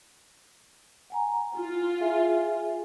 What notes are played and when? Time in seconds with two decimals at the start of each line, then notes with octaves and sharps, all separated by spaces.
1.10 F#5 G#5 A#5
1.57 E4 F4
2.01 G#4 E5 G#5